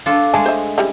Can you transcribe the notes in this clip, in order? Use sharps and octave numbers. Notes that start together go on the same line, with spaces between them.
D4 F4 A4
G#3 A3 G#4 G#5 A5
C5 E5
G3 C#4 E4